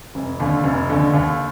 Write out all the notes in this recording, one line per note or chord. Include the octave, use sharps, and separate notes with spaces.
F1
D#2 D3
F1
D#2 D3
D#2